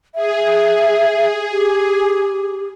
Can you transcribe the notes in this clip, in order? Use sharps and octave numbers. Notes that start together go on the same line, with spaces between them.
G#4 E5
G4